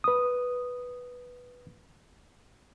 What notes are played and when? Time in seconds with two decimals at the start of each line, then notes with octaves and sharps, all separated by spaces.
0.04 B4 D#6